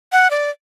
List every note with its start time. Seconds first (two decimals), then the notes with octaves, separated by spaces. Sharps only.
0.12 F#5
0.30 D5